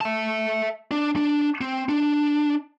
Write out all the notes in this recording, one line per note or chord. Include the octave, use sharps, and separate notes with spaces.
E5 A5
D4
D4
C4
D4